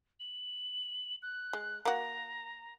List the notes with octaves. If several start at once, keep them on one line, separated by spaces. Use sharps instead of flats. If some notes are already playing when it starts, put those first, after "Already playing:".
F#7
F#6
G#3
A#3 F#4 A#5